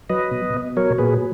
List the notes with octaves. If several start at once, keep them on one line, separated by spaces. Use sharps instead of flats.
F#3 B4 D#5
B2
B2
F#3 A#4 C#5
A#2 G#4 B4